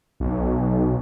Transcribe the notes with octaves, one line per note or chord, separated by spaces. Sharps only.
B1